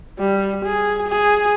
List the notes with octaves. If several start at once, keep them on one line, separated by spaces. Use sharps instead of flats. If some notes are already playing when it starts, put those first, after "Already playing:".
G3
G#4
G#4